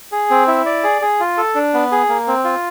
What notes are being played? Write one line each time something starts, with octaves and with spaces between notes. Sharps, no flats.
G#4
C4
E4
D5
G#4
G#4
F4
A4
D4
B3
G#4
A#3
C4
F4